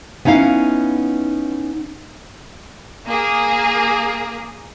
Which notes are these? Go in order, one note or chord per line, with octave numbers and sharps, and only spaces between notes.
B3 C#4 D#4 E4 F5
A#3 G#4